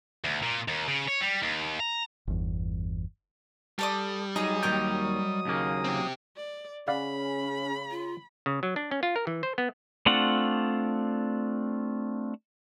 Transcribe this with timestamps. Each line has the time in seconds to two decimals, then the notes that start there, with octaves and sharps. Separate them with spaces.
0.25 D2
0.43 A#2
0.68 D#2
0.87 C#3
1.08 C#5
1.21 G3
1.43 D#2
1.80 A#5
2.27 G1 E2
3.79 G3 A4 D5 D#6
4.36 F#3 D#4 G#4 D#5 A#5 D#6
4.63 D#2 C#3 A#4 C#5 D#5 G5
5.45 D#2 C#3 A#3
5.84 C4 G4
6.37 D5
6.88 C#3 C#4 D5 F5 F#5 B5
7.91 F4
8.46 C#3
8.63 F#3
8.76 D4
8.91 C#4
9.03 F4
9.16 A#4
9.27 E3
9.43 C5
9.58 B3
10.06 A3 C4 D4 F4 F#5